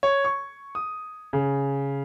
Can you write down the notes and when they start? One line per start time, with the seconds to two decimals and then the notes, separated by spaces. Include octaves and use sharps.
0.03 C#5
0.25 C#6
0.75 D#6
1.33 C#3